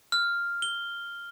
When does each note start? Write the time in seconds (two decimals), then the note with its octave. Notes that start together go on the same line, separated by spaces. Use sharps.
0.12 F6
0.62 G7